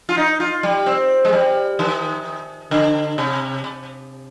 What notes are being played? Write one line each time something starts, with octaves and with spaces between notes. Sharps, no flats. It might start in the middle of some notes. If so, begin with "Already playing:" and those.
F4
D#4
F4
G3
C4
G#3
G3
D#3
D3
C3
C3